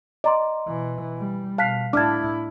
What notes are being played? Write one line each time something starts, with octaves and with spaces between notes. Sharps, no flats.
D5 D#5 A#5 C6
B2 E3
G3
B2 F5 A5 F#6 B6
A2 D4 E4 A5 D6 F6 G#6